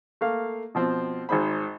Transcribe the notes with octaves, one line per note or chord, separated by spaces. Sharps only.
A3 A#3 F5
B2 F3 C4
G#1 D#4 G#4 C5 B5